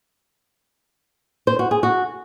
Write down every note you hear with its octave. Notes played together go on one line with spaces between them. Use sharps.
C5
F#4
G#4
F#4